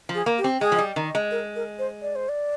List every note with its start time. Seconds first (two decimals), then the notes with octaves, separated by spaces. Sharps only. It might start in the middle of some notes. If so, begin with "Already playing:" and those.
0.09 F3
0.15 G#4
0.26 A#3
0.38 G4
0.44 C4
0.61 G#3 G#4
0.72 F3
0.78 G3
0.96 D#3
1.15 G#3
1.31 A#4
1.56 A#4
1.79 C5
2.02 D5
2.15 C5
2.29 D5